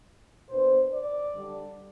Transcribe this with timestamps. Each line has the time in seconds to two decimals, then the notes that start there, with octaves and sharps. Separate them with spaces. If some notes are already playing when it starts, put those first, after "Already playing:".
0.49 B2 B3 D4 C5
0.91 D5
1.33 D3 G3 D4